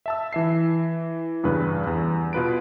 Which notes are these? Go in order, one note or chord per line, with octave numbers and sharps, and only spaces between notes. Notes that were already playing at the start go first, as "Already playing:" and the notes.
E5 A5 E6
E3 E5 C7
E2 G2 C#3 G3 B4
E2
B2 F4 B4 D7